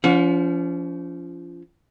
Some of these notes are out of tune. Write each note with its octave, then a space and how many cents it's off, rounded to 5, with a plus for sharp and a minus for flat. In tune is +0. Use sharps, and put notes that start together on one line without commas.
F3 -20 C#4 +35 F#5 -45